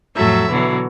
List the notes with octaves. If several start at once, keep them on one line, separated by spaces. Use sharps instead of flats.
F2 A2 F#3 A4 E5
B2 D3 E3 F#3